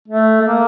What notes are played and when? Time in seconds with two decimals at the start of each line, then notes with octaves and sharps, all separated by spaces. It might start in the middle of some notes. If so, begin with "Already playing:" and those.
0.08 A3
0.41 A3
0.47 A#3